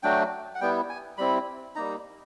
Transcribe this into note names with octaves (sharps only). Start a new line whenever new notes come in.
F#3 A3 D4 F#4 G5
F#5
G3 B3 E4 G5
G#5
G3 C4 E4 B5
G3 A#3 D#4 A#5